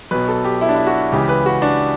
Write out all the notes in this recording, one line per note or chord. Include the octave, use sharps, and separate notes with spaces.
B1 B2 B4
A4
G4
E4
D4
E4
F#4
C#2 C#3 E3 G4
B4
F#4
D4